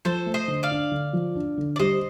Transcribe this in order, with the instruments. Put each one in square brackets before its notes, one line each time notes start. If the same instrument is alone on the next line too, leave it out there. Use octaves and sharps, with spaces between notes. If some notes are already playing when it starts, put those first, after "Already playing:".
[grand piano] F3 [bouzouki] A4 C5
[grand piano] A3
[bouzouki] C5 D#5
[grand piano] D3
[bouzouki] D5 F5
[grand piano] D4
D3
F3
D4
D3
[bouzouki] D5
[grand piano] G3 [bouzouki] C5 D#5